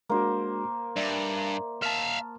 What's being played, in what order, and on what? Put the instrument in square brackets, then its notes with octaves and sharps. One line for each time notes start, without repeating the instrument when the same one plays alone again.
[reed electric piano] G#3 D4 F#4 [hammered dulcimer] A#3 C5
[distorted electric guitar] G2 [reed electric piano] D5 E5
[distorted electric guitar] E5 F5 [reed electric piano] A5 F6